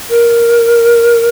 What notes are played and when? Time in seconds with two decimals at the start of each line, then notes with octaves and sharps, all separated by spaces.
0.09 A#4